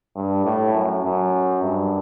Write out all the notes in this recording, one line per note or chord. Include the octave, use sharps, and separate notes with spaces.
G2
A2
F#2
F#2
G2